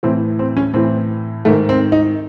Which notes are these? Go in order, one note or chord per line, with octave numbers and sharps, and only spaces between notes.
A2 E3 C4
C4
C#4
A2 E3 C4
G#2 D#3 A3
C4
D#4